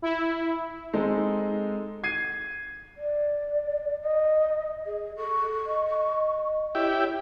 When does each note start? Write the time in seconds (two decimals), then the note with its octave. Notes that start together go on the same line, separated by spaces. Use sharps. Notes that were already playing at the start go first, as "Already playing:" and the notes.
0.02 E4
0.93 G#3 C4 D#4 A4
2.04 G#6 C7 D#7
2.98 D5
4.01 D#5
4.86 G#4
5.17 A4 C#6
5.66 D#5
6.75 E4 G4 C#5